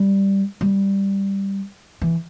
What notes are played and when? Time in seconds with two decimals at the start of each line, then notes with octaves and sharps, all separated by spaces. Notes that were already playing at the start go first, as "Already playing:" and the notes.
Already playing: G3
0.61 G3
2.02 E3